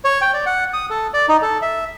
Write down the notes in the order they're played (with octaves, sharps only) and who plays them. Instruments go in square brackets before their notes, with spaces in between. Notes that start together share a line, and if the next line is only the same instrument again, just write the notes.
[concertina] C#5
G5
D5
F#5
D#6
A4
D5
D#4
A4
E5